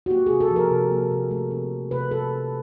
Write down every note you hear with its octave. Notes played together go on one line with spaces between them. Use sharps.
F#4
A#3 G4
G#4
C3
A4
F3 A#4
C3
A#3
C3
A3
C4
F3
C3 B4
A3 A4
C4